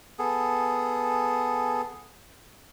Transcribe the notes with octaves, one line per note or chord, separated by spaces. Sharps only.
B3 G#4 A4